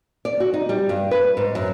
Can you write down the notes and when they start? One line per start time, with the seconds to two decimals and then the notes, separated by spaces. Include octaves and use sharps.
0.25 D5
0.40 F#4
0.54 D#4
0.69 G3
0.89 G2
1.11 B4
1.37 G#2
1.55 F#2